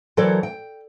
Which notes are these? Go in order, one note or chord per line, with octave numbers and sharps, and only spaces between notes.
E3 F#3 A4 A#4 C5 D5
G5